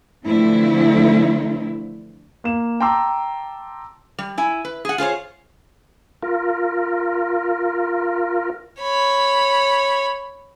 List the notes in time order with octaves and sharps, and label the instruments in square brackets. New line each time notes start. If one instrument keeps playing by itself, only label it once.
[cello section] D3 E3 F3 A3 C4 E4
[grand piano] A#3 E7
G5 A5 A#5 C6 D6 E6
[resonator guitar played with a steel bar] G3
E4 G#5
B4
G#4 F#5
F4 G#4 C5 C#5
[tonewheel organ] F4 A#4
[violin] C#5 B5